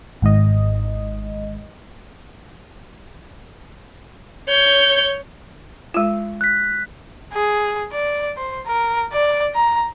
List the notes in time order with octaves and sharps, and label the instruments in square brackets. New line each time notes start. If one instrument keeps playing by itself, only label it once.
[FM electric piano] G#1 G#2 D#5
[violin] C#5 G6
[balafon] G#3 F4
[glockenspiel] F#6 B6
[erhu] G#4
D5
C5
A#4
D5
A#5